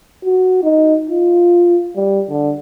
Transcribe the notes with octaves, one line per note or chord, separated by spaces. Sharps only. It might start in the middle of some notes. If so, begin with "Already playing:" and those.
F#4
D#4
F4
G3
D3